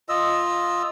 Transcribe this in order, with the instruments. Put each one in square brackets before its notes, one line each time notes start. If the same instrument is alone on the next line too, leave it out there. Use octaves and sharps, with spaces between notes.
[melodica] F4 D#5 E6